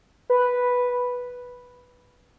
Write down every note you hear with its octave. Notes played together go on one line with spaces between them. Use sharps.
B4